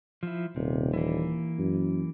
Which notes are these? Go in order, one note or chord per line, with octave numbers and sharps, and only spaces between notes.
F3 E4
D#1 C3
E3 A#3
F#2